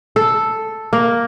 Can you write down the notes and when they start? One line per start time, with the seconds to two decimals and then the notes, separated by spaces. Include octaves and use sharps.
0.16 A4
0.93 A#3